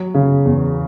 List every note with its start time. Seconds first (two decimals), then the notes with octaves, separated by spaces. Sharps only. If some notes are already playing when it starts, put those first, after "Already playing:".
Already playing: F#3
0.14 C#3
0.45 E2